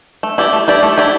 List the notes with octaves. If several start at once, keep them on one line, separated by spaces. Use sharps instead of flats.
A3
E4 G4 D5
A3
E4 G4 D5
A3
E4 G4 D5